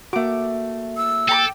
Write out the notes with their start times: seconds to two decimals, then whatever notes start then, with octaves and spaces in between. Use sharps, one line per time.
0.13 A3 A#3 F#4 D6
0.97 E6
1.29 A4 G5 A#5 D6